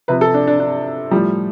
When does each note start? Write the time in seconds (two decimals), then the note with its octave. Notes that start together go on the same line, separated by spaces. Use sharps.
0.08 C3 F3 B4
0.21 A4
0.34 D4
0.47 D4
0.60 D4
1.11 A2 F3 G3